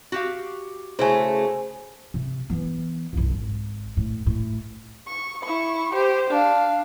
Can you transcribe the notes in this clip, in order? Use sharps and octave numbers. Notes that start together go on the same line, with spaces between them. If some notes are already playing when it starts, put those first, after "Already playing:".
F#4 G4 F5
C#3 A3 E4 F#4 C5 G#5
C3
E3 B3
F#1 C2
G#1
A2
A2
C#6
E4 C#6
G4 C5
D4 F5